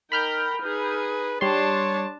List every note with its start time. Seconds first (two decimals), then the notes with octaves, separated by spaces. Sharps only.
0.12 D#4 A#4 G5 B5 F6 G6
0.63 D#4 G#4 B4
1.41 G3 D4 C#5 A5 C6